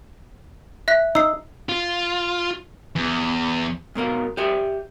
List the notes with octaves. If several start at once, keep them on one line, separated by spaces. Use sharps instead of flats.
E5 F#6 B6
D#4 E6 C7
F4
E2
G#2 B2 A#4 F5
G4 D5 E5 G5 G#5